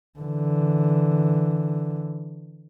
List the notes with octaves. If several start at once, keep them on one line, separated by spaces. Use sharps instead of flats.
D3 E3